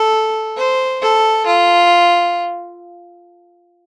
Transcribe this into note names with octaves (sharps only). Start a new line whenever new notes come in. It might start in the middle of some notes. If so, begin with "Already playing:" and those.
Already playing: A4
C5
A4
F4